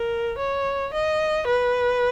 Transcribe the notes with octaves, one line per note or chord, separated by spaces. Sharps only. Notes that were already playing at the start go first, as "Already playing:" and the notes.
Already playing: A#4
C#5
D#5
B4